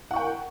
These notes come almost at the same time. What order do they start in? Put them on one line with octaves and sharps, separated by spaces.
F#5 C#6 G5 A#4